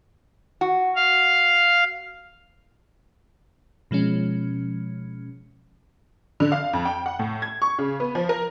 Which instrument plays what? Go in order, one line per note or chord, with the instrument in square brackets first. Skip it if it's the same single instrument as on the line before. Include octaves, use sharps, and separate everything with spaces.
[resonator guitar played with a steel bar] F#4
[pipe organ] F5
[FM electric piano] B2 F3 G#3 C#4
[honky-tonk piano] D3
F5
F2
G5
F#5
A2
G#6
C#6
C#3
B3
F3
A#4